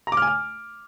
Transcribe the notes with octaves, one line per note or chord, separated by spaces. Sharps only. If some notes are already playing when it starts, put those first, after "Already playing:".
A#5
D6
F6
G#5
F6